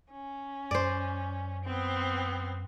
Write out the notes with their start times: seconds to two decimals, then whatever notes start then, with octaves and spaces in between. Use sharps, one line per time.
0.12 C#4
0.71 F#2 C5 D5
1.64 B3 C4